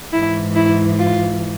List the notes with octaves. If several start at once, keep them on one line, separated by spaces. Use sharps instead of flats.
G#2 E3 E4
E4
F4